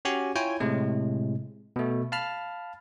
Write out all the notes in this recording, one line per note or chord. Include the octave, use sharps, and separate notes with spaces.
C#4 F#4 G4 G#5
E4 F4 C#5 G5 G#5
A2 C3 G#3
B2 A3
F5 A5 B5 F6